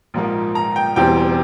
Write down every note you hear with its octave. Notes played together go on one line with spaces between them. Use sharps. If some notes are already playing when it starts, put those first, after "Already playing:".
A#1 G#2 F3 A#3
A#5
G5
E1 E2 E3 G3 C4 G5